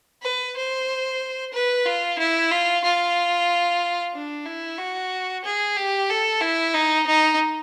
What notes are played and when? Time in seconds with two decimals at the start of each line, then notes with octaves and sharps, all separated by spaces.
0.23 B4
0.56 C5
1.53 B4
1.86 F4
2.19 E4
2.51 F4
2.84 F4
4.14 D4
4.46 E4
4.78 F#4
5.44 G#4
5.77 G4
6.10 A4
6.41 E4
6.74 D#4
7.07 D#4